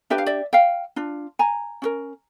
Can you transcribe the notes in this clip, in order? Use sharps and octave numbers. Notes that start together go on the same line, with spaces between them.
D4 G4 B4 E5
F5
D5 E5
F5 G5
D4 F4
G#5 A#5
C#4 F#4 A#4